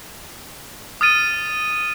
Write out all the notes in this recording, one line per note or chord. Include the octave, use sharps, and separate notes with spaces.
D#6 F6 A6 D#7